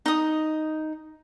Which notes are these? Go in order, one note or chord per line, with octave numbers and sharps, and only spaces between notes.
D#4 D#6